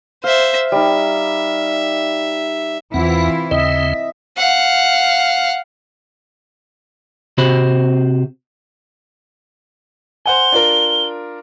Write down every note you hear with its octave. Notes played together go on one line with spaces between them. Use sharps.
C5 E5 F5
G3 D#4 E5
E2 E3 C4 E4 F4 F#5
D#2 C#3 C4 E4 D#5 E5
F5 F#5
C3 C4 F#4 C5 B5
C5 F#5 G#5 G7
D4 F4 A#4